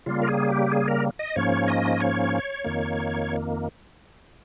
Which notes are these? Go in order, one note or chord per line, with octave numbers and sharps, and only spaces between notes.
C#3 G3 A#3 F4
A#4
G#4
G4
G#4
A#4
D#5
G#2 F3 A#3 C#4 C#5
D#5
C#5
F2 D#3 A#3